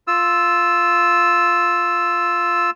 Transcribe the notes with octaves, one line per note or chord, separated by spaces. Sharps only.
F4 E6